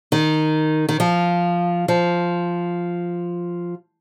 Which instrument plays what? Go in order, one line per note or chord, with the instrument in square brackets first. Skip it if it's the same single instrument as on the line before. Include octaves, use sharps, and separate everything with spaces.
[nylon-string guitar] D#3
D#3
F3
F3